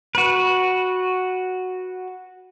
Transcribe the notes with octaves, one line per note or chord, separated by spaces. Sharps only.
F#4 B4